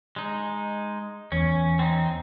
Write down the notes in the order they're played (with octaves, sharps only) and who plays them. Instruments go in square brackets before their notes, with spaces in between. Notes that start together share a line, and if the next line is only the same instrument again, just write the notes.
[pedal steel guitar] G#3 D#4
[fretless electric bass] E2 [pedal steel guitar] C#4
[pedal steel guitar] C4 D#4